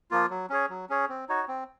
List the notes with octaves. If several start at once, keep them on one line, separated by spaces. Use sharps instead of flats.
F3 A#3 F4
F#3
C#4 G#4 C#5
F#3
C#4 G#4 C#5
C4
D#4 F#4 C#5
C4